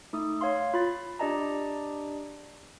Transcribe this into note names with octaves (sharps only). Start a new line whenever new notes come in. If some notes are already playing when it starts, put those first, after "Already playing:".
A3 D#4 D#6
C#5 F5 C6
F4 B5 A6
D4 G4 D5 D#5 A5 A#5